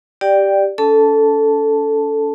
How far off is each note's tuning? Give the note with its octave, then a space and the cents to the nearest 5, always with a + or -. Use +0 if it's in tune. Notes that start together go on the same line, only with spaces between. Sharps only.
G4 +0 D5 +5 G5 +0
C#4 +45 A4 +0 A5 +0